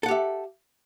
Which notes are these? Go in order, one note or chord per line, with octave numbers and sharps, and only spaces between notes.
G4 A4 E5 F#5